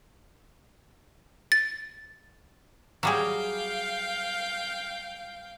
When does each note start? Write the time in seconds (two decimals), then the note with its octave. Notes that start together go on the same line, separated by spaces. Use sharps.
1.52 A6
3.03 F#3 G3 G#4 F5 G5